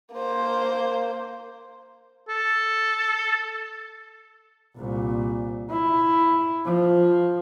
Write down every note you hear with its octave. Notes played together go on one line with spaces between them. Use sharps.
A#3 C5
A4
C2 A#2
E4
F3